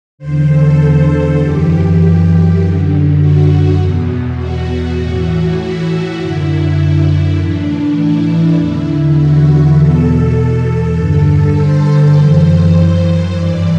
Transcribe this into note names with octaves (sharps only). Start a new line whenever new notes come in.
E2 D3 C5
A4
F#2 E3 G4
F#2 D3
F#4
E2 B2
F#4
A2 E3
E4
F#2 D3
A2 E3 D4
E4
E2 D3
F#4
E2 B2 A4
A4
G2 D3
C5
F#2 E3
G2 E3 D5